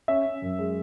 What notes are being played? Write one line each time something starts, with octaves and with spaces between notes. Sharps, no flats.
C#4 E5
C#4
F#2
G#3